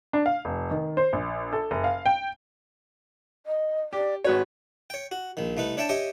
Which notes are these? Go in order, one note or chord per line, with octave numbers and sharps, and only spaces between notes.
D4
F5
F1
D#3
C5
A#1
A4
F#1
F5
G5
D#5
G4 D5
G#1 F#4 B4 C#5
C#5 G5
F#4
A#1 D#3
C2 A3 D#4 B4
D4 C#5 E5 G5 A5
G4 C#5 D#5 E5 G5 G#5